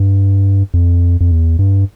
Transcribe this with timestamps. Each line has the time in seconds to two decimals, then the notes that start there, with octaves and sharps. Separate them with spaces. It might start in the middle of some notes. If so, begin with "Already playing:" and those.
Already playing: G2
0.74 F2
1.21 F2
1.31 E2
1.59 G2